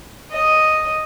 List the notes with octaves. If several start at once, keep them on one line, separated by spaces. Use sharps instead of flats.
D#5